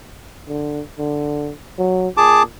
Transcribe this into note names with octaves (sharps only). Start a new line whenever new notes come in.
D3
D3
F#3
A#2 G#4 A5 D6